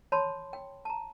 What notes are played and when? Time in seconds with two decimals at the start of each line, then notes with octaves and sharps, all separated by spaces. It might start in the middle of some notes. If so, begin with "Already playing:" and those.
0.12 C#5 A5 B5 C6
0.53 G5
0.85 A5 A#5